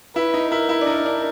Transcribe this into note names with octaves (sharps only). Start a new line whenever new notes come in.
E4 B4
D#4
E4 A#4
E4
D4
D#4 A#4
D4